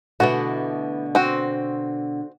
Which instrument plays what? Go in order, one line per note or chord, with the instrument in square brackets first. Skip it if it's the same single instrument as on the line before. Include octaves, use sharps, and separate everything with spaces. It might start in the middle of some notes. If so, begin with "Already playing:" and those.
[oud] B2 D3 A3 [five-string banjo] E3 F#4
[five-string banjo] C4 F#4